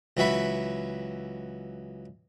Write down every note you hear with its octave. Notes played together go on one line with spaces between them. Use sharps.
C#2 E3 F#3 F#4 E5 B5